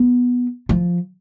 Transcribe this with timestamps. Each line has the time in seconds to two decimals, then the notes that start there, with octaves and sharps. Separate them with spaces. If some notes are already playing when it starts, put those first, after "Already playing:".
Already playing: B3
0.69 F3